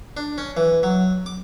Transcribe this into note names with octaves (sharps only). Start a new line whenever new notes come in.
D4
C#4
E3
F#3
D6